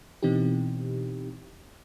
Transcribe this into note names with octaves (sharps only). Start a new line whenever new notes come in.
B2 E3 C4 D#4 G4